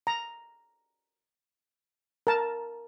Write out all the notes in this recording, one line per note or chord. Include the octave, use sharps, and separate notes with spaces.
A#5
A#4 A5